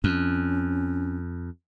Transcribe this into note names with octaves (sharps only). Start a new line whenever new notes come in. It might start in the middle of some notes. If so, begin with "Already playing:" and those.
F2 C#4